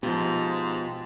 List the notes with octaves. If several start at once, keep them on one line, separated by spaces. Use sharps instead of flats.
G#2 B2 F3 F4 G4